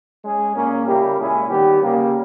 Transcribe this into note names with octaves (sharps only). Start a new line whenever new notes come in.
G#3 C#4 G#4
A#2 A#3 C#4
C#3 G3 A#3 E4 G4
A#2 G#3 C#4 E4 G#4
D#3 G3 B3 G4
C#3 G3 A#3